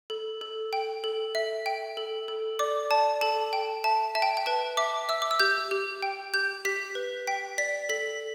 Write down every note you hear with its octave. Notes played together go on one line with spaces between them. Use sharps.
A4
A4
G5
A4
E5
G5
A4
A4
D5 D6
D5 A5
A4 A5
G5
E5 A5
E5 A5
G5
G5
B4 A5
E5 D6
E5 E6
D6
E6
G4 G6
G4
G5
G4 G6
G4 B6
B4
G5 B6
D5 B6
A4 B6